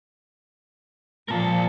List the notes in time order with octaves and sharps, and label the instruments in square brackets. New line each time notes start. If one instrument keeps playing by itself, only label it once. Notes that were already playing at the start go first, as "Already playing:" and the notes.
[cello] A#2 F3 [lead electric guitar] A#4 A5